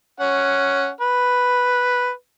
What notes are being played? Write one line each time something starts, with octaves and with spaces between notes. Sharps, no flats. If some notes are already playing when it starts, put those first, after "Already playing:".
C#4 F#5
B4